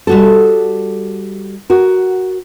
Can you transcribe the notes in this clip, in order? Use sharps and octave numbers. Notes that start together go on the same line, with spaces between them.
G3 F#4 A4
F#4 A#4